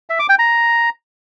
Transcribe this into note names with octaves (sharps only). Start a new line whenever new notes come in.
E5
D6
G5
A#5